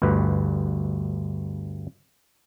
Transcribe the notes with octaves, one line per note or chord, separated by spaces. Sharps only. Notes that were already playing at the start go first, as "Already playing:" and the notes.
G1 D2 G2 B4